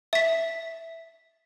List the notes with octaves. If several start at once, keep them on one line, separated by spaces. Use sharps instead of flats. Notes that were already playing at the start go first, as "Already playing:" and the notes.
E5 B6